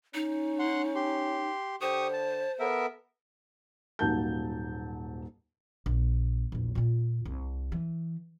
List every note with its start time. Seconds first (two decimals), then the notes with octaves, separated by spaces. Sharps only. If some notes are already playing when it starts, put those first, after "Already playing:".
0.14 C#4 D#4
0.59 F#5 C6
0.95 G4 C6
1.81 D3 G4 C5 C#6 D#6
2.13 A5
2.60 B3 A4 A#4 E5
3.99 D#1 G#2 F#3 A#3 A5 G6
5.86 A#1
6.52 A#1 E2
6.75 A#2 F4
7.25 C2
7.72 E3